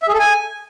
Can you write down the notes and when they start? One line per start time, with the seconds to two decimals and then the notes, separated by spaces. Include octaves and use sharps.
0.02 E5
0.08 G#4
0.14 A4
0.19 G#5